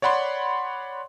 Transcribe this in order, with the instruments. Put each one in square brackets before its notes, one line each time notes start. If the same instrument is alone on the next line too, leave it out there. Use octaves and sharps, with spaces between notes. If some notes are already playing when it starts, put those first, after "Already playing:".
[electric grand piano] C#5 D5 F#5 B5 C6